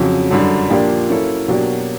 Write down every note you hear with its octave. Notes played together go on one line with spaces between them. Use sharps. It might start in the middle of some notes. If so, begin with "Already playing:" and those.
Already playing: F2 C#3 F#3
F#2 D3 G3
A#2 F3 A#3 D4 G4
F#3 A#3 C#4 E4 A4
B2 F#3 A#3 D4 G4